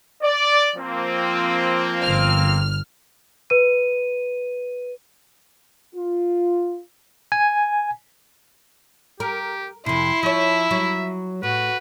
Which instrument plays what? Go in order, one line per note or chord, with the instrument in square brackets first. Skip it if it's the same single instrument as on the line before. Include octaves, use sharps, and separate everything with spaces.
[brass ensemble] D5
F3 A#3 C4
[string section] G1 F6
[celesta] B4 D#7
[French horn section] F4
[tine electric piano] G#5
[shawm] G4 [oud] A#4
[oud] F2 C3 [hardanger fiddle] E4 [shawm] C6
[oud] F3 C#5 [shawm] E5
[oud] F#3
[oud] A2 [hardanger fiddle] F#4 [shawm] B4